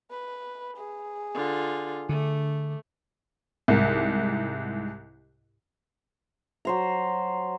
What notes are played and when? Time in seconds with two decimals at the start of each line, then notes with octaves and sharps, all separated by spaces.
0.11 B4
0.77 G#4
1.35 D3 F4
2.09 D3 A3
3.68 C2 G#2
6.65 F#3 C5 A#5